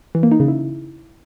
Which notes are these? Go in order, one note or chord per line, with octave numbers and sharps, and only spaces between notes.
E3
A#3
D#4
C#3
E4